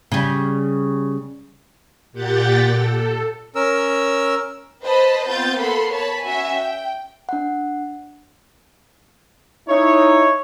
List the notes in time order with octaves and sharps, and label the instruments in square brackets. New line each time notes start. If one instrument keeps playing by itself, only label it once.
[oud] C#3 G3
[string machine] A#2 G4 F#5 G5 A6
A4
[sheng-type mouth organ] C#4 A#4 E6
[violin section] B4 C5 D#5 A5 B5
B3 C4 F4 G6 A6
A#3 B3 A4 B5 C6
C#5 A5 B5
C#4 F#4 E5 G#5
G5
[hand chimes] D4 F#5
[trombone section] D#4 E4 [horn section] C#5